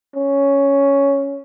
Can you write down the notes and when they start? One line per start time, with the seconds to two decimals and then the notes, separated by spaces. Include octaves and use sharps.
0.15 C#4